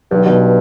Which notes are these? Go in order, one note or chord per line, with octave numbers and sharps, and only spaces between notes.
B1 G2
G2 B2